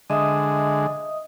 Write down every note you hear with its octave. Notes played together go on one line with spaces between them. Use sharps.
D3 G#3 D#5 E5 D#6